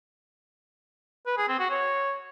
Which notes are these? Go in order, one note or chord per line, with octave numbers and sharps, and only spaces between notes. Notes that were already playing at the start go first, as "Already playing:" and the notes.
B4
G#4
C4
F#4
C#5